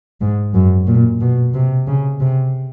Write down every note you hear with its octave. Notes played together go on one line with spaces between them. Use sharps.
G#2
F#2
A#2
B2
C3
C#3
C3